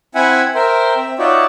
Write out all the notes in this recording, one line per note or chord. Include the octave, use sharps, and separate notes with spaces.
C4 E4 E5 F#5 G#5 B5
A#4 C5 E5 G5
C4 E5
D#4 F4 F#4 C#5 D5 E5